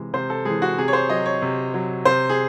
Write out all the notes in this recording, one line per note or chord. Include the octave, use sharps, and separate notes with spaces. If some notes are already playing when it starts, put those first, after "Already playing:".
Already playing: C3 E3 G#3
C3 C5
A4
E3 G#3 G#4
F#4
C3 G#4
C#5
C5
F#3 D#5
C#5
C3
F#3
C3 C5
G#4